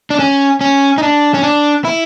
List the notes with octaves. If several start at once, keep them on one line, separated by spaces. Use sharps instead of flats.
D4
C#4
C#4
D#4
D4
C#4
D4
E4